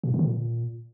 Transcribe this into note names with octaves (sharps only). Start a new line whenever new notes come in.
B2
A2
D3
D#3
A#2